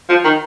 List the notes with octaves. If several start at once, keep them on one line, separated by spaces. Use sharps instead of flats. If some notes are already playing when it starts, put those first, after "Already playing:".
F3
D#3